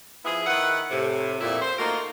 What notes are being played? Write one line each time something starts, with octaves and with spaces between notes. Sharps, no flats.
F3 B3 E4 G#4
D#3 E4 B4 F#5
A2 C3
F2 A#2 E4
C5
A3 A#3 D#4 F4 F#4 A#4